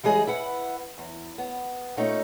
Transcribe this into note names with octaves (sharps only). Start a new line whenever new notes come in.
E3 G3 G#3 G#4 D#5
E4 B4 F#5
E2
B3
A#2 A3 C#4 D#4